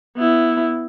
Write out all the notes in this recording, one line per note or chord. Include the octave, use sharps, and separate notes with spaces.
B3 E4